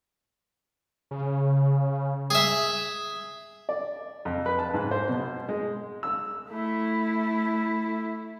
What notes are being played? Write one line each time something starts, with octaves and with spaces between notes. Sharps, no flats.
C#3
G#4 E5
D5
F2
B4
A5
G#2
C5
B2
G#3
E6
A3 E4